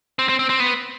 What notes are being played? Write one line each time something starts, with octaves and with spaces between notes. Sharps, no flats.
C4
C4
C4
C4
B3